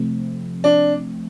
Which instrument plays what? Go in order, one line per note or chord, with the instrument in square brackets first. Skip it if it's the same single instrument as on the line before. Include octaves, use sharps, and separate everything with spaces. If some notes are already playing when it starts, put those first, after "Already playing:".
Already playing: [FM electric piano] C3 F3 A3 C4
[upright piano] D4